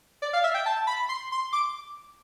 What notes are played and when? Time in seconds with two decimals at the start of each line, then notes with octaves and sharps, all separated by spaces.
0.22 D5
0.33 F5
0.44 E5
0.54 G5
0.66 A5
0.87 B5
1.09 C6
1.32 C6
1.53 D6